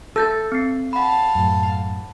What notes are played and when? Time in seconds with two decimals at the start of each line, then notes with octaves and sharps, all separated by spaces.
0.16 A4 E6 G6 A6
0.52 C4 C7
0.93 F5 F#5 A5 B5
1.35 F#2 A2